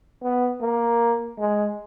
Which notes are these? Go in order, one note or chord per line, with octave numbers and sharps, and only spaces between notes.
B3
A#3
G#3